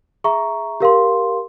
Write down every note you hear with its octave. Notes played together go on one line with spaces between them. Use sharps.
G#4 E5 A#5 C#6
G4 A#4 F5 C6